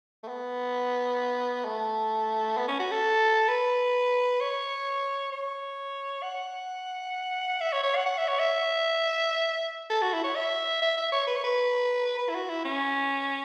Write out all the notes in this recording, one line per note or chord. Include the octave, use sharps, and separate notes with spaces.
A3
B3
A3
B3
C#4
F#4
A4
B4
C#5
C#5
F#5
E5
C#5
C#5
F#5
F#5
E5
C#5
E5
A4
F#4
E4
C#5
E5
E5
E5
C#5
B4
C#5
B4
B4
E4
F#4
E4
C#4